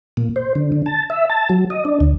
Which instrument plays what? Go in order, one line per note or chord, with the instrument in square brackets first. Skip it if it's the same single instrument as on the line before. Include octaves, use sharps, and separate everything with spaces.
[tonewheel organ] A#2
C5
D3
D3
A5
E5
A5
F#3
D#5
D4
D2